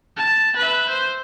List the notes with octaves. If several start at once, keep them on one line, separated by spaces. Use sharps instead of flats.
A5
B4 E5
C5